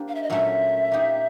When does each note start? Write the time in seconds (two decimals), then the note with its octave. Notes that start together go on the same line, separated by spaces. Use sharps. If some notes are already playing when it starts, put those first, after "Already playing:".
Already playing: A#3 D4 G4 C5
0.08 F5
0.15 E5
0.23 D#5
0.30 A#2 F#3 A3 C#4 E5
0.92 A#3 D#4 G4